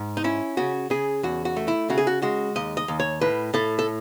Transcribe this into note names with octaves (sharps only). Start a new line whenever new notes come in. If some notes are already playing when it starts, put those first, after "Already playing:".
Already playing: G#2
D#4
C#4 E4
C#3 F#4
C#3 G#4
E2 F#4
F#4
A3
E4
C#3 F#4
G#4
F#4
G#3 F#4
D#2 D#5
D#5
D#2
C#5
A2 B4
A2 A4
A4